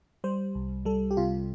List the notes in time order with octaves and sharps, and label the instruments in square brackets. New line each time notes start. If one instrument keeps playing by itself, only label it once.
[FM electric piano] G3 C5
C2
G3 A4
G4
C3 F4